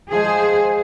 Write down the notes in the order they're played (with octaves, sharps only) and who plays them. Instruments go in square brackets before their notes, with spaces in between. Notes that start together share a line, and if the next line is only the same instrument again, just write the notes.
[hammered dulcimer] F3 G#3 [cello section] G#4 C5